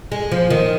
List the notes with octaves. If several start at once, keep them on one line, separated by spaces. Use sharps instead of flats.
G#3
F3
D#3